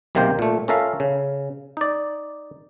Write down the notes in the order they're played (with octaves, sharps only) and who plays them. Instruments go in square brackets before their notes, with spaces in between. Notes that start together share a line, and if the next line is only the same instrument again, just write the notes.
[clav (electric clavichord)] B1 C3 D#3 A#3 C5 G5
A#2 A3
C#4 F4 A4 A#4 E5 F5
C#3
D#4 D5